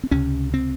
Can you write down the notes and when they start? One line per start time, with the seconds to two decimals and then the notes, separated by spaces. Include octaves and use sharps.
0.04 C4
0.11 C#2 C3 C#4
0.54 C4